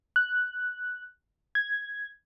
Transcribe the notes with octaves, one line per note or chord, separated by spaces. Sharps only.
F#6
G#6